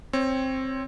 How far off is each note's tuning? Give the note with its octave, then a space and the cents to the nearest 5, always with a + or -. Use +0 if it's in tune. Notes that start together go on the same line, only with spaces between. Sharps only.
C4 +10 C#5 +0